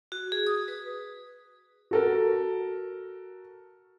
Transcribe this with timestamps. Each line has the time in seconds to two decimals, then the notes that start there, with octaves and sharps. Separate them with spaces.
0.12 F#4
0.32 G#4
0.47 D#6
0.68 B4
1.91 F#4 A4 A#4